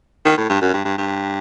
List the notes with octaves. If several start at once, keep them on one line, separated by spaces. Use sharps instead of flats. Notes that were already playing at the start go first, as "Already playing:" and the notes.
D#3
A2
G2
F#2
G2
G2
G2